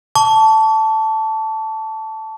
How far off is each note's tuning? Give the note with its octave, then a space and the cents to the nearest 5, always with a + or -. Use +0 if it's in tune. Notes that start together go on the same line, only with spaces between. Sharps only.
A5 +0 C#6 +45